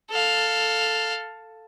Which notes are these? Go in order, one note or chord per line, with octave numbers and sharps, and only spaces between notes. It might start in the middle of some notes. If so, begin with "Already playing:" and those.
A4 F5